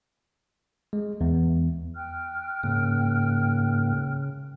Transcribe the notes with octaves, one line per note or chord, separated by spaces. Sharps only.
G#3
E2
G5 F6 F#6
G#2 C#3 A#3